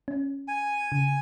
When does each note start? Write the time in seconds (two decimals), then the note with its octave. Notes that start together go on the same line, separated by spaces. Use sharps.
0.08 C#4
0.48 G#5
0.92 C#3